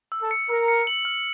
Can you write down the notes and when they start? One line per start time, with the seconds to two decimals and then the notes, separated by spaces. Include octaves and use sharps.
0.12 E6
0.22 A4
0.31 C#7
0.49 A#4 E6
0.68 C#7
0.87 F#7
1.05 F6